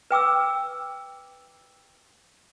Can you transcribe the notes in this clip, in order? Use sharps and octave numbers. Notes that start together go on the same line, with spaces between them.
B4 G5 D6 E6